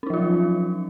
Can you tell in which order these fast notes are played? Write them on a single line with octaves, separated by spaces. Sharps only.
C#4 D#4 F3 F4 F#3